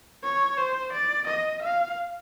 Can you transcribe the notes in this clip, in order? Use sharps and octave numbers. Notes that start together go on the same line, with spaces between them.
C#5
C5
D5
D#5
F5